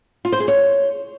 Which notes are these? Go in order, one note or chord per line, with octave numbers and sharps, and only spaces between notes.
F4
C5
G#4
C#5